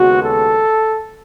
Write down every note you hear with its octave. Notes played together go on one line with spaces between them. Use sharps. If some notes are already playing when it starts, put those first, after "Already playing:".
Already playing: D#2 C#3 G#3 B3 F#4
A4